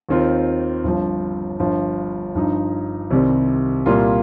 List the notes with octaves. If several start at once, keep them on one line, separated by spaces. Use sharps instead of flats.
D#2 D#3 C4 F4
G1 G2 F3
G1 G2 F3
G2 F3 D#4
C2 C3 D#3 G3 C4
C2 A#2 G3 A#3 F4